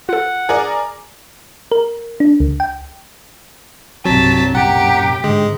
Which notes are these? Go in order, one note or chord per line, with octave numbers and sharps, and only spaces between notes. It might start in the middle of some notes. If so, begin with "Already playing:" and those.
F4 A4 F#5
G#4 A#4 D5
A#4
D4
C#2
G5
C2 G2 F#3 C4 A5 B6
F#2 A#2 G4 F#5 A#5
G#2 D3 G#3